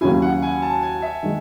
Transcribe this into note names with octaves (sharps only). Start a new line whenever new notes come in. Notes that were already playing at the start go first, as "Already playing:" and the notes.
D#2 C#3 F#3 C#4 E4 G#5
F#5
G#5
A5
G#5
E5
D#3 G#3